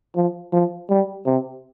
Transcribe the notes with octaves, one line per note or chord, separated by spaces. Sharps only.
F3
F3
G3
C3